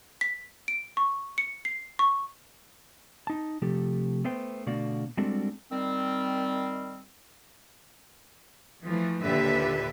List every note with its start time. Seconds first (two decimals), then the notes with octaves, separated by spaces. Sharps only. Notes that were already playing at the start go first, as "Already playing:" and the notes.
0.21 B6
0.68 D7
0.97 C#6
1.38 C#7
1.65 C7
1.99 C#6
3.27 D#4 A5
3.62 C3 F3 A3 G4 A4
4.24 A3 B3 B4 C5 G5
4.66 B2 D3 A3 F#4 D5 F5
5.17 G3 G#3 C4 D4 F#4 A4
5.70 D#3 G3 C4
8.84 E3 F3 A3
9.23 D#2 A#2 D3 G4 B4 E5